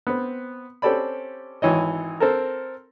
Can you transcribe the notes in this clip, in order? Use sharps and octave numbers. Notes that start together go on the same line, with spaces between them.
B3 C4
C4 C#4 G4 A4 D5 B5
G#1 E3 C#5 D#5
C4 A4 A#4